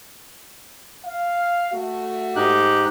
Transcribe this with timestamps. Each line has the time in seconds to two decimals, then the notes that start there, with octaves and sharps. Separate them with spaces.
1.05 F5
1.72 A3 F#4
2.36 G#2 D#4 G4 F#6